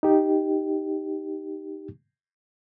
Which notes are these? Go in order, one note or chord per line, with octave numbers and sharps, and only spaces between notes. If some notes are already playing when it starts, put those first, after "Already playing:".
D#4 G4